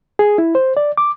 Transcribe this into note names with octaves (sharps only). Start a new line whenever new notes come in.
G#4
E4
C5
D5
D6